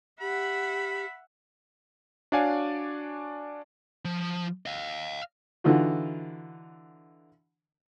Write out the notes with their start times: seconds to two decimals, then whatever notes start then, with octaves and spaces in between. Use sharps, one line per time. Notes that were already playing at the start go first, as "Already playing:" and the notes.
0.21 G4 E5 F#5 B5
2.32 D4 F#4 C#5 D5 F5 G#5
4.05 F3
4.66 D#5 F5
5.64 D3 E3 D#4 F4 F#4